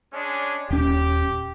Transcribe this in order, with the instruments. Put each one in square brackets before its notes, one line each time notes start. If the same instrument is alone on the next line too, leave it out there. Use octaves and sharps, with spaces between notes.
[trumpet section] G#3 C#4 D4
[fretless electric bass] D#1 C#4 [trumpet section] G4